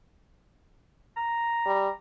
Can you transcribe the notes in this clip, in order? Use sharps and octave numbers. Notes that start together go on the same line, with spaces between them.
A#5
G3